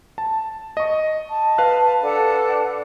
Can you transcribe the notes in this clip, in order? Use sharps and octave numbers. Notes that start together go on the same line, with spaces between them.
A5
D#5 C#6
A5
B4 F5 F#6
D4 A4 F#5